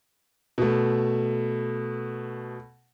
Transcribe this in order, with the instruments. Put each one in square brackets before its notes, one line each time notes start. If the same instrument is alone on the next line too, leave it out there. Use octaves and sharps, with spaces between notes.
[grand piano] B2 A3